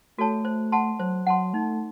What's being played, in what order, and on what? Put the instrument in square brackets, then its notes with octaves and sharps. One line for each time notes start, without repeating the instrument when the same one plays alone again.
[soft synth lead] A3 [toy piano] F#4 A4 C#5 A5
[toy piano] C5
F#5 A5 C6
[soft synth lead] F#3 [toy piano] C5
[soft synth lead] F#3 [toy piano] F#5 A5 C6
[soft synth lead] A3 [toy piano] D#4